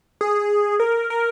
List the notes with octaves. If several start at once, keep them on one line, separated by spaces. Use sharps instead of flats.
G#4
A#4
A#4